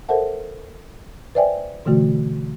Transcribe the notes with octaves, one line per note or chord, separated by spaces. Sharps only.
A4 A#4 C5 E5 F#5 A5
B4 C5 D5 E5 G5 G#5
B2 D3 E3 A3 F#4